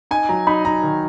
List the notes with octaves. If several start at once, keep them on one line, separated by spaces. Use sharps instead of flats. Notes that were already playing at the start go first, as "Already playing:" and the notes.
D#4 G#5
F#3 A#5
D#4 B5
D#4 A#5
D#3